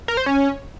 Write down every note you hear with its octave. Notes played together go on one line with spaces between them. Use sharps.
A#4
C5
C#4